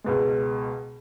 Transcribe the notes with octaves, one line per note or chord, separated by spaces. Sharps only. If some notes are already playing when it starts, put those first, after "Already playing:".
C#2 B2 G#3